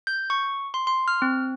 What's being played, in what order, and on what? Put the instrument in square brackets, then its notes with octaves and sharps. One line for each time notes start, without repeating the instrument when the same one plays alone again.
[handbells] G6
C#6
C6
C6
F6
C4